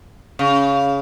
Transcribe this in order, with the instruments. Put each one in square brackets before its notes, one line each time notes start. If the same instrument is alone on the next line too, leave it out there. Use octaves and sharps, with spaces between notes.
[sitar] C#3